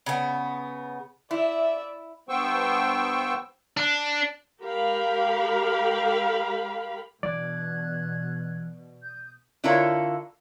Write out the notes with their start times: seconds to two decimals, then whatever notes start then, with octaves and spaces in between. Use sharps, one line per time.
0.06 C#3 B3
1.31 E4 D5 E5
2.29 G2 B3 C5 G5 C#6 E6
3.77 D4
4.62 G#3 G4 A#4 F5 B5
7.23 B2 E3 D4 D5 F#6 G#6
9.03 D#6 G6
9.64 D3 E4 F4 A4 A#4 C#5